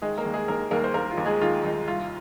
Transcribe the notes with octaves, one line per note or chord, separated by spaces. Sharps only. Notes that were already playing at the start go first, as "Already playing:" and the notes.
D#3 G#3 G#4
A#3 A#4
D#2
G#3 G#4
D#2 A#3 A#4
D#2 A#3 A#4
C5
D#2 A#3 A#4
F4
D#2
G#3 G#4
D#3 F4
D#2 D#4
C2 F4